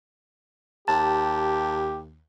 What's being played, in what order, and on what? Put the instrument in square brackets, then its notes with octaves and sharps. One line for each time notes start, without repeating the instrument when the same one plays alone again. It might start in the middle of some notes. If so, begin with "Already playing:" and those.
[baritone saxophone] D#2 [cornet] G4 [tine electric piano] A5